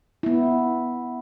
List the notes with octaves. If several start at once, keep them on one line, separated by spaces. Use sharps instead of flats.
B3 E4